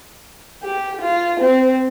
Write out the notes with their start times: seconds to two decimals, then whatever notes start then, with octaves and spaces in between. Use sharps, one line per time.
0.64 G4
1.01 F4
1.41 C4